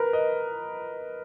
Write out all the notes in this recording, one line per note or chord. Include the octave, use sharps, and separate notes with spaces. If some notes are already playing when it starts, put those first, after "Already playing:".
Already playing: A#4 B4
D#5